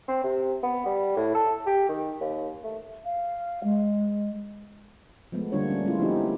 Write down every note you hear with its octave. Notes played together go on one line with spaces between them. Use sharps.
C4
C3
B3
G3
A2
A4
G4
D#3
D#2
A3
F5
G#3
F3 G#3 A3 B3
D3 G3 A#3 D4 F4 C#5
C#4
G#3 A3 B3 C#4 E4 F4
F3 A3 C4 D#4 E4 G4
A#3 E4